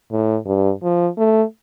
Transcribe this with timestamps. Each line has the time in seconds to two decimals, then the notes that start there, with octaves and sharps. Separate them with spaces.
0.12 A2
0.46 G2
0.83 F3
1.18 A3